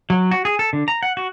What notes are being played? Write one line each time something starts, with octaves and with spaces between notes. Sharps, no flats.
F#3
F#4
G#4
A4
D3
A#5
F#5
F#4